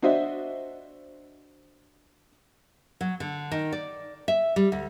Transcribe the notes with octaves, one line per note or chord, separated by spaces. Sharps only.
D4 F#4 C5 D#5 E5
F#3
D3
D#3
D5
E5
G3
D2